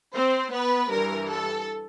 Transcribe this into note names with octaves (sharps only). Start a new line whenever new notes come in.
C4 C5
B3 B4
G2 E3 A#4
A4